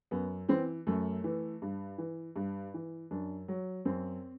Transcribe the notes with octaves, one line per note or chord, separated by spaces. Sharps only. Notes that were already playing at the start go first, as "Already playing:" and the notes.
F#2 B3
E3 C4
F#2 A3
E3
G2
E3
G2
E3
F#2 D4
F#3
F#2 C4